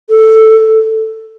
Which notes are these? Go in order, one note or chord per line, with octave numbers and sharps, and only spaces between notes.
A4